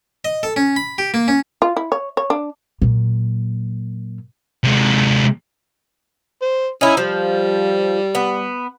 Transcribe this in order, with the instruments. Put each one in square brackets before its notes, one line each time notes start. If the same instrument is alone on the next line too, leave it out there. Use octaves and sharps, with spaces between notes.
[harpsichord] D#5
A4
C#4
B5
G4
A#3
C#4
[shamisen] F4
E4
C#5
C#5
D4
[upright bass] A#2 F#3
[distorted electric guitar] C3 G#3
[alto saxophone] C5
[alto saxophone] C#4 [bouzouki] D#4 E4
[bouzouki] F3 [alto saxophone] G3
[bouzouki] B3